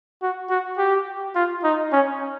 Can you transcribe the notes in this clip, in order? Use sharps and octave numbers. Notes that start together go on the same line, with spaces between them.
F#4
F#4
G4
F4
D#4
C#4